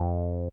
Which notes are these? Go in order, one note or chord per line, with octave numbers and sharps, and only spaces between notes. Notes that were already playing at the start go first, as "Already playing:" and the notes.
Already playing: F2